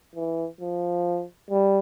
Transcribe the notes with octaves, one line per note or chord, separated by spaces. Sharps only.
E3
F3
G3